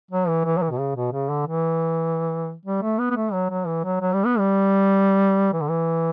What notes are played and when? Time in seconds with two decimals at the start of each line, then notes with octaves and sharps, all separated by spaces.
0.11 F#3
0.28 E3
0.45 E3
0.57 F#3
0.62 E3
0.71 B2
0.79 C#3
0.96 B2
1.13 C#3
1.29 D3
1.46 E3
2.65 G3
2.82 A3
2.99 B3
3.10 B3
3.16 A3
3.32 F#3
3.50 F#3
3.67 E3
3.84 F#3
4.01 F#3
4.13 G3
4.26 B3
4.39 G3
5.53 E3
5.61 D3
5.69 E3